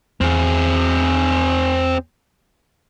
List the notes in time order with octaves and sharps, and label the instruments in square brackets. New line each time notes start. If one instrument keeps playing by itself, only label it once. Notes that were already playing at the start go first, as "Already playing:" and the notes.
[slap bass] E2 [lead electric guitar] C4 G#4